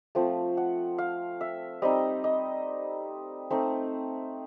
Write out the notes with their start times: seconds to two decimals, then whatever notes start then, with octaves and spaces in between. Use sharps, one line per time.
0.15 F3 A3 C4
0.57 F#5
0.98 F5
1.41 E5
1.82 G3 C4 D#4 D#5
2.24 D#5
3.50 A3 C4 D#4